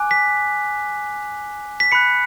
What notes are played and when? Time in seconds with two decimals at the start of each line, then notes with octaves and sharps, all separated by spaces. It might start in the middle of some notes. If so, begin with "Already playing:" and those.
Already playing: G#5 D6 F#6
0.11 B6
1.80 B6
1.92 B5 F#6 C#7